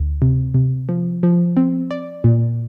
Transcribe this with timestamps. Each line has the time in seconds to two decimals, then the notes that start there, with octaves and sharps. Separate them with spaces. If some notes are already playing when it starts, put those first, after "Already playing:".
Already playing: D2
0.22 C3
0.54 C3
0.89 F3
1.23 F3
1.57 C4
1.91 D5
2.24 A#2